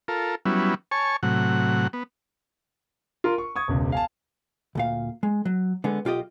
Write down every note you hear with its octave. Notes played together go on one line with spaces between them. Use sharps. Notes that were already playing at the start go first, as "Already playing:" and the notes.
F4 A4 A#4
F#3 G3 B3 C#4 E4
C#5 G#5 A5 C#6
A2 C3 F#3 F#5
B3
F4 A#4 C6
C#6
C#6 D#6 G#6
E1 C#2
F5 G#5 A5
D2 A#2 F5
G#3
F#3
D3 G#3 B3
B1 F4 G4 D#5